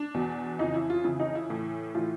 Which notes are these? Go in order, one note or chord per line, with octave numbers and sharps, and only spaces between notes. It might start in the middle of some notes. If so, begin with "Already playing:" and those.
Already playing: D4
E2 B2
F2 C#3 E3 D#4
E4
F4
F2 C#3 E3 E4
D#4
E4
A2 E3
A2 E3 F4